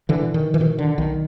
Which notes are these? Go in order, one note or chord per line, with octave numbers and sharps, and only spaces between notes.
D3 E3
B2
D#3
E3
B2 D#3
D3
B1 D#3